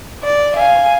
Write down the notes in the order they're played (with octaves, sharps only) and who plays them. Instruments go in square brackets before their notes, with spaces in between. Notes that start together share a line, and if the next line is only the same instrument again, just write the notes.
[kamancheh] D5
F5 G#5